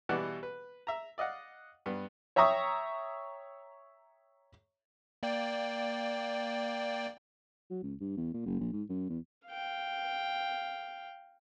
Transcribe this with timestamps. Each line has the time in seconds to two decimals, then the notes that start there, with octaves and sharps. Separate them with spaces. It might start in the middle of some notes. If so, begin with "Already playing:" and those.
0.09 B2 E3 G3 B4 D5 F#5
0.43 B4
0.87 E5 A#5
1.18 D5 D#5 F5 F#5
1.86 G2 B3
2.36 C#5 E5 G5 A#5 C#6 D#6
5.23 A#3 D5 G5
7.70 F#3
7.83 C#2
8.00 G2
8.17 E2
8.34 A#2
8.46 F#1
8.60 A#1
8.73 G#2
8.89 F#2
9.09 E2
9.48 F5 G5